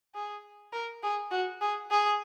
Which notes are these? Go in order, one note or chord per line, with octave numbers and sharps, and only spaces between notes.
G#4
A#4
G#4
F#4
G#4
G#4